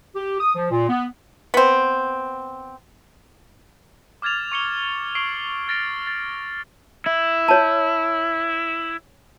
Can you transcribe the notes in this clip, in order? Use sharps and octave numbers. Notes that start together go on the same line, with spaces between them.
G4
D#6
F3
A#2
B3
B3 C4
D6 F6 G#6 A6 F7
C#6 C#7 G7
C#6 E6 C7 D7 F#7 G7
F6 A6 A#6 D7
A6
E4
C#5 A5